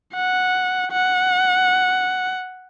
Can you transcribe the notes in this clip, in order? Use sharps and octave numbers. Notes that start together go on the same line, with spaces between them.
F#5
F#5